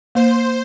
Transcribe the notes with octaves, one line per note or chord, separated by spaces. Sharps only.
A#3 C5